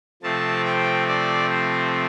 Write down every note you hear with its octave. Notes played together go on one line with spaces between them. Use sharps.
C3 F3 A3 C4 A5
G5
D5
C5